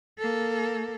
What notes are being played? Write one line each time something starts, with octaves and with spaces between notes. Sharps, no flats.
A#3 A4